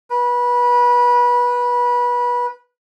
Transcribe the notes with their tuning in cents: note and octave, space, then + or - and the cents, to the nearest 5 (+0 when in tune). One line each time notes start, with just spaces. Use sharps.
B4 -25